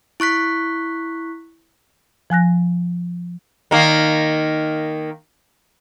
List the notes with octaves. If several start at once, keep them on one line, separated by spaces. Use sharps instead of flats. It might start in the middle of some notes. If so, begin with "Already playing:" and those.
E4 C#6 F#6 B6
F3 G#5 F#6 A#6
D#3 A#3